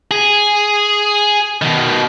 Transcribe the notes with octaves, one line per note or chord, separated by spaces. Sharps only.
G#4
B2 D#3